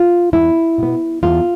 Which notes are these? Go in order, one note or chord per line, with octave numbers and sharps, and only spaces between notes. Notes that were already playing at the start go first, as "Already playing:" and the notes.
Already playing: F4
E2 E4
B2 B3
E2 F4